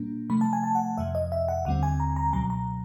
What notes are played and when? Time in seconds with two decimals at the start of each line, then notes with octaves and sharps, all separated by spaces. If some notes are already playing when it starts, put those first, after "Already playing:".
Already playing: A#2 G3 A#3 D4
0.30 C3 F3 A3 B5
0.41 A5
0.53 G#5
0.63 A5
0.75 F#5
0.98 F2 C3 F3 E5
1.15 D#5
1.32 E5
1.48 F#5
1.65 D#2 D3 G3 C4 F#5
1.83 G#5
2.00 A#5
2.16 A#5
2.33 C#2 B2 F#3 A#5
2.50 A#5